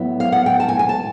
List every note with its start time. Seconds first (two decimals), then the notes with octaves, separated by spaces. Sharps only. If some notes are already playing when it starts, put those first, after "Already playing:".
Already playing: A2 F#3 B3
0.20 F5
0.32 F#5
0.46 G5
0.60 A5
0.68 G#5
0.79 G#5
0.89 A5